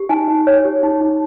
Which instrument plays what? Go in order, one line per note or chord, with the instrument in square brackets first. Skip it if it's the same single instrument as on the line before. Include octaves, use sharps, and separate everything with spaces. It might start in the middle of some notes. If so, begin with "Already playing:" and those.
Already playing: [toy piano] G4
D#4 G#5
D#4
C#5
G4
D#4
D#4